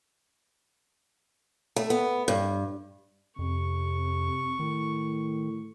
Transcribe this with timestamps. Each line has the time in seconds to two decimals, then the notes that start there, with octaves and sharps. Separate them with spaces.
1.76 A3
1.90 B3
2.28 G2
3.39 F2 C3 C#6
4.59 A2 D#3